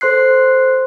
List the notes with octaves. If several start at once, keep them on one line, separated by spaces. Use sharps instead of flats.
A4 C5 C6 F#6 C7